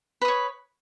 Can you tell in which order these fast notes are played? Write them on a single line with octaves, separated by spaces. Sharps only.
B4 D#6 C#5